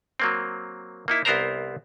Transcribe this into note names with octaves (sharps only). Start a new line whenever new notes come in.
F#3 A#3 C4
A#3 D#4 E4
C2 B3 C4 A#4 C5 A#5